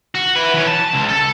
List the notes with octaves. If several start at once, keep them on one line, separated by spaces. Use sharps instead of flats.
F#4
E4 B4
E3 C#4
A5
C#2
A4